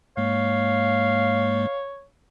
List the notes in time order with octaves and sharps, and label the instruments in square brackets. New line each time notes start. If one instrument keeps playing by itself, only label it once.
[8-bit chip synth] G#2 G#3 A#3 [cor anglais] C#5 [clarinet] F5